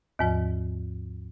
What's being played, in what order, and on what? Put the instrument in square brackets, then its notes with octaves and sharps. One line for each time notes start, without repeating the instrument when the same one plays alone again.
[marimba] D#2 G#2 F3